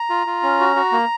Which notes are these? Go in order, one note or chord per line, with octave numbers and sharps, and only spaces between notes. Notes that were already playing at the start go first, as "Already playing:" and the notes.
Already playing: A#5
F4
F4
C#4
F#4
F#4
A#3